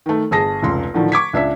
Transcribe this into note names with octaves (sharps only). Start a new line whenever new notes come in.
D#3 A3
G1 G#4 A5 A#6
F1 C#2 C6
A2 D3 D#3 F3
C#6 D6 G#6 B6
C#2 D4 E5 B6